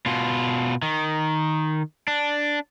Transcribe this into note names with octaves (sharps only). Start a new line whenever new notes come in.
B2 F4
D#3
D4